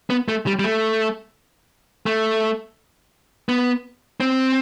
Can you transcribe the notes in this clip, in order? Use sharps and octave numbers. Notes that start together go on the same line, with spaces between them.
B3
A3
G3
G3
A3
A3
B3
C4